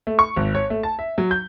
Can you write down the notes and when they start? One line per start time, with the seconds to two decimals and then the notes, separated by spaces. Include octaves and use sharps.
0.07 A3
0.19 C#6
0.36 G#1
0.55 C#5
0.70 A3
0.83 A5
0.99 E5
1.18 F#3
1.31 G6